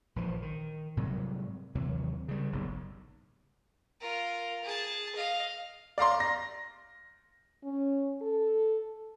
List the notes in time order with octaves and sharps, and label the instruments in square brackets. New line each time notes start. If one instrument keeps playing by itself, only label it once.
[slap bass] A#1 E3 F3
D#3
G#2 C3 F#3 G3
D#2 C3 E3 F#3
C#3 G3
F#1 B1 G#2
[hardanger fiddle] F4 A#4
G#4 A5
D#5 F5
[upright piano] D5 F5 A#5 C6
A#6
[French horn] C#4
A4